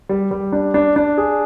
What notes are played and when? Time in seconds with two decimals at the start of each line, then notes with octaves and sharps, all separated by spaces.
0.09 G3
0.31 G3
0.52 D4
0.74 D4
0.96 D4
1.18 G#4